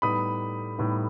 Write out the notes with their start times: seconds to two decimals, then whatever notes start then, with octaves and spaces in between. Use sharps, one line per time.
0.02 A2 G3 B3 D#4 B5 D#6
0.78 A2 G3 B3 D#4